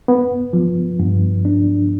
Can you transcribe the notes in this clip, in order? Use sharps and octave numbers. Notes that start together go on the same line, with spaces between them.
B3
F3
G2
D4